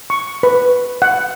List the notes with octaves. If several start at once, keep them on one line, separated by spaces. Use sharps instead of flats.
C#6
B4
F#5